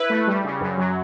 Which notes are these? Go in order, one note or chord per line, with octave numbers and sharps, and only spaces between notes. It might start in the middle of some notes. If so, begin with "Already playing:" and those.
Already playing: E4 B4
A3
G3
C#3
F#2
F#3